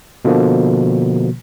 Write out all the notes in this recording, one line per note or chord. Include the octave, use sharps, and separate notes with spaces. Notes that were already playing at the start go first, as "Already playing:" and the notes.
B2 D3 F3 A#3